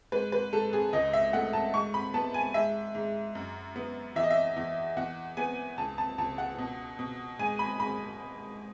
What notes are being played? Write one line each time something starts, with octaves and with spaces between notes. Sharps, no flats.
G#2 B4
B4
G#2 A4
G#4
C#2 D#5
E5
A3 F#5
A5
G#2 C#6
B5
B3 A5
G#5
G#2 E5
G#2
F#2
B3
E2 E5
D#5
E5
E2
E2 F#5
B3 G#5
C#2 A5
A5
C#2 A5
F#5
B2
B2
G#2 G#5
B5
G#2 B5